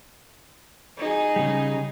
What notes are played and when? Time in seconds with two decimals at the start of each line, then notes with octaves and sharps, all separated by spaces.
0.98 D#4 G#4
1.36 C#3 G3